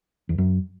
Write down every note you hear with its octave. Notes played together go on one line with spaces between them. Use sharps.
E2
F#2